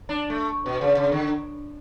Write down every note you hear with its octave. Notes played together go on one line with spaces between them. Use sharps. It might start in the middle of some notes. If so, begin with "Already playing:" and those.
D4
A3
B2
C#3
C#3
D3